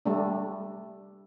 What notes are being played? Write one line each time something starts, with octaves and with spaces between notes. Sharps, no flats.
G3 A3 D4